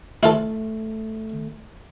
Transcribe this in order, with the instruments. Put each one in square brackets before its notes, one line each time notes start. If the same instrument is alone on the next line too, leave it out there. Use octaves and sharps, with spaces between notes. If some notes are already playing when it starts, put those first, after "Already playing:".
[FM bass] A3 [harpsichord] E4 F4 A4